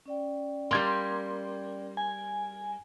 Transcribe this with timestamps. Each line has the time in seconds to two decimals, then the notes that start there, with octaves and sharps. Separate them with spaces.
0.06 C#4 D5 G5
0.71 G3 A#3 C6 G#6
1.97 G#5